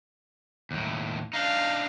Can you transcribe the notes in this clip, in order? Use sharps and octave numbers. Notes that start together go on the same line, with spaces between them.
D#2 A2
D4 D#4 F5